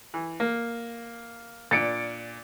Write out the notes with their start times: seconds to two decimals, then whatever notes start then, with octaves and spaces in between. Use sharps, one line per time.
0.14 E3
0.40 A#3
1.71 A#2 D4 A6 C#7 D7